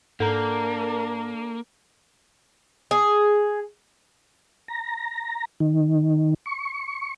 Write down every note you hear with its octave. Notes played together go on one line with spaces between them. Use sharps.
G#2 A#3 D4 A4 A#4 A#5
G#4
A#5
D#3
C#6